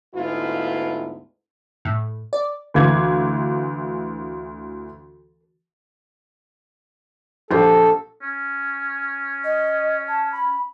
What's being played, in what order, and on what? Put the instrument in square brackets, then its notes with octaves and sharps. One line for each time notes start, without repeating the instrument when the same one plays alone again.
[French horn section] D2 G#2 B3 E4 F4
[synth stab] A2
D5
[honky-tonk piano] D2 E3 F5 D6 G#6
[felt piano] A#1 G4 C5 [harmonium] A4
[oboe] C#4
[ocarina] D#5
A5
B5